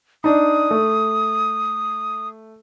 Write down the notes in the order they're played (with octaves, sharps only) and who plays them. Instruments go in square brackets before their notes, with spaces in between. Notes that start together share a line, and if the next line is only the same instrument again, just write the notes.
[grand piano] D4 D#4 [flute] D#6
[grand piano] A3